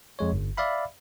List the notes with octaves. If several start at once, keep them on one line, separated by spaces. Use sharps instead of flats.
F2 G#3 C#5
G1
D5 E5 F5 B5